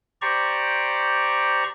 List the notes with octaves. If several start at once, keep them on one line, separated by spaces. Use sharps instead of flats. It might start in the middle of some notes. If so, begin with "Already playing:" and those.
G4 C5 D5 A#5 C#6